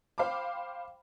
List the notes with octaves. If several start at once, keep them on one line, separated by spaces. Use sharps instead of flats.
C5 F5 G5 B5 D6